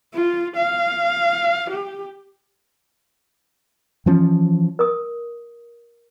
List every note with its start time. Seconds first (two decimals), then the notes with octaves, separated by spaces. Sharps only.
0.14 F4
0.56 F5
1.71 G4
4.06 E3 F3 C#4
4.79 A#4 D#6